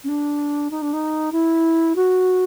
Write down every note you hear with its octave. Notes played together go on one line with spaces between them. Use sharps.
C#4
D4
D#4
D4
D#4
E4
F#4